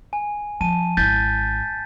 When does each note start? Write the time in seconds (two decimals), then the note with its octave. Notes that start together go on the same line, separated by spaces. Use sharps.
0.13 G#5
0.61 F3 A5 D#7
0.97 G#1 E4 G6 A6 B6